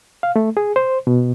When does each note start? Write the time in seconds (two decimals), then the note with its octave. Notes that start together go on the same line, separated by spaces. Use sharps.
0.23 F5
0.36 A3
0.57 G#4
0.76 C5
1.07 B2